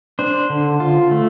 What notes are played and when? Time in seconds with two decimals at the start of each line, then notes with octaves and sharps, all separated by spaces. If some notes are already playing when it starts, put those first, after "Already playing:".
0.19 D4 C5
0.50 D3
0.80 F4
1.11 A3